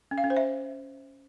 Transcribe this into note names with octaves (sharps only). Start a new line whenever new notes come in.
C#4
F5
C#4
C5
E5